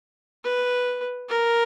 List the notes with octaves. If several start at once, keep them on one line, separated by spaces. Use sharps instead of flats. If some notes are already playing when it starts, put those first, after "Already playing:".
B4
A#4